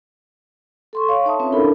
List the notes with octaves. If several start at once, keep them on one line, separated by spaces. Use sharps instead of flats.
A4 C6 C#6
C#5 F5
D#4 C#5 E5 A5 D#6
C4 C#4 F4 B4 C#5 E5
D4 E4 A4 A#4 B5